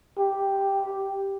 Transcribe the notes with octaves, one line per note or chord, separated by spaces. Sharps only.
G4